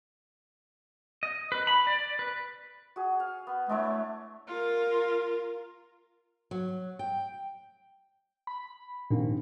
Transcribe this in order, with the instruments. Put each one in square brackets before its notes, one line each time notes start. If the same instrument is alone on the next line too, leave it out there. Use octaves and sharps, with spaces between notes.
[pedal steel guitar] D#5
B4
B5
D5
B4
[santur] F#4 G#4
F5
B3
[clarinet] A3 [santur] D4 E4 C#5
[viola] F4 A#4
[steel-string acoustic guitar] F#3
G5
[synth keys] B5
[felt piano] A#1 D#3 C4 [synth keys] A#2